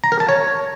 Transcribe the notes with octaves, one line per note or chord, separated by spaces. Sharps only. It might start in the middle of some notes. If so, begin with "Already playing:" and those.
A#5
A#4
A5
C#5